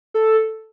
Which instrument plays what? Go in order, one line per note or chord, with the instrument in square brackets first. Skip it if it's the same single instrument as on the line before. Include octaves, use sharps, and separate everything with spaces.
[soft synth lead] A4